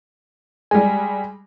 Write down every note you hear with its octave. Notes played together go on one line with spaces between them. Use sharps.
G3 G#3 G#5